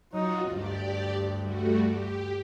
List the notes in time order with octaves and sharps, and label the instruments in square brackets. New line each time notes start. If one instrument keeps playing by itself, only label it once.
[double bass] F#3 D#4 [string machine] F4 F#4
[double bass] D2 G2 [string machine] G4 D5
[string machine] G3 A3 F#4
G4